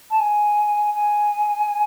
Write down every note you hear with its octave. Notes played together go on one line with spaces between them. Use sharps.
A5
G#5
G#5